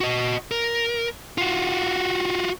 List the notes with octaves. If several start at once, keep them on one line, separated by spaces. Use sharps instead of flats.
F#4 D#5
A#4
F4 F#4